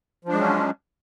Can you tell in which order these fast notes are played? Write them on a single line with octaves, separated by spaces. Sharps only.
F3 D4 G#3 F#3 C#4